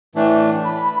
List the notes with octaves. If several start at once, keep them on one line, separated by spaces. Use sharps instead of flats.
A2 E3 A3 D4
B5